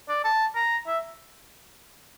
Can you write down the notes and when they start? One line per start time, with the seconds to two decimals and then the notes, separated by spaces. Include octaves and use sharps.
0.08 D5
0.24 A5
0.55 A#5
0.87 E5